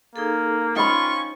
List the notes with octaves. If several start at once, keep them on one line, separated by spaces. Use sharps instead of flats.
A#3 D#4 G#4 A4
C#4 D#4 F4 C5 G5 B5 C#6